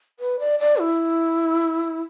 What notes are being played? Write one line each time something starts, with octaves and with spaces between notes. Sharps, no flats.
B4
D5
D5
E4